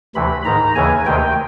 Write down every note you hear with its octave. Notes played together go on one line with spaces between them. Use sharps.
D2 C3 E3 B5
G#2 D#3 A#5
D#2 C#3 E3 G#5
D2 C3 D#3 G5